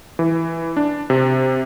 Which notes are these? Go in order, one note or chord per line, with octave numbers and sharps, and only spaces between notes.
E3
D4
C3